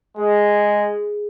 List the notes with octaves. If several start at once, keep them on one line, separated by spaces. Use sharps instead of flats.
G#3 G#4